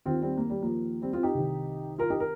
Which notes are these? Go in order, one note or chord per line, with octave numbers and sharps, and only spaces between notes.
D#2 D#3 C4 F4
G3 C4
A#3
G3
F3 A#3
G3 C4
C4 F4
D#4 G4
C2 C3 D#3
F4 A#4
D#4 G4
A#4